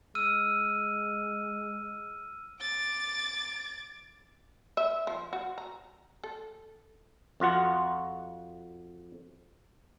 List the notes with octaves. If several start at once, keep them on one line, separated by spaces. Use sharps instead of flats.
G#3 E6 F6 D#7
D6 A6
E5
F3
F#4
A#5
A4
F2 F4 F#4 F#5